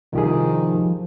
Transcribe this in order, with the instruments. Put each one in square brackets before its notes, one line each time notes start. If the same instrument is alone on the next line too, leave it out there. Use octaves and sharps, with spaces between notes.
[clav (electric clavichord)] C2 G4 G#4 [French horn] D#3 [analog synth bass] F3